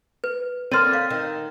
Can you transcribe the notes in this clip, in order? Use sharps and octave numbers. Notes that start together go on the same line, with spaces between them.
B4
D3 A#3 C4 C#5 C6 F6 A6 D#7
F5
D#3